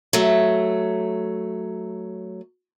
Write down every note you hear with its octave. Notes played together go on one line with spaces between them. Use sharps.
F#3 A3